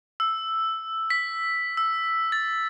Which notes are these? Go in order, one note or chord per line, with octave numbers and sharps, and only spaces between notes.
E6
B6
E6
A6